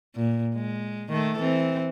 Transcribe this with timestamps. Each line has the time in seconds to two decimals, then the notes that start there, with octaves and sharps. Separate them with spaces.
0.16 A#2
0.54 G#3
1.10 D#3 A3 A4
1.39 E3 C4